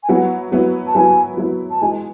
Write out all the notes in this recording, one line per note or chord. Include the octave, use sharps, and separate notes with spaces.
G#5
F#3 B3 E4 F#5
F#3 B3 E4
A5
F#3 B3 E4 G#5
F#3 B3 E4
A5
E3 G#3 D#4 G#5